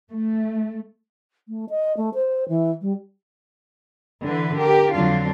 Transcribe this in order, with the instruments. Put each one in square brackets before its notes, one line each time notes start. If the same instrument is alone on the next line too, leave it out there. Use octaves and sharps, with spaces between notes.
[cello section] A3
[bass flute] A3
D#5
A3
C5
E3
G3
[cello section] D3 E3 B4
G4 A#4
F2 D3 F#3 D4 F4